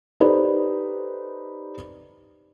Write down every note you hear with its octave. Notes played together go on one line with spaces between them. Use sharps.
D#4 G4 A4 B4 C5 D5